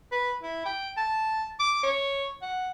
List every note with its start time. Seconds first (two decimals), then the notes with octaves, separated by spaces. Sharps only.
0.12 B4
0.43 E4
0.65 G5
0.97 A5
1.60 D6
1.83 C#5
2.42 F#5